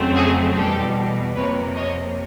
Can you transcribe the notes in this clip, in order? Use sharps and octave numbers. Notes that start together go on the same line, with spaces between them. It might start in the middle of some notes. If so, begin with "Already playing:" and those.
Already playing: F2 C#3 F#3 A3 C4
F#4 G#4
E2 B2 G3 G4 A4
F2 C3 F3 A#3 B4 C#5
C#5 D#5